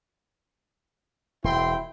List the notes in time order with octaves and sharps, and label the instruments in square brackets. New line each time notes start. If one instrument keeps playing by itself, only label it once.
[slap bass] E1 [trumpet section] C4 G5 C6 [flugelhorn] E4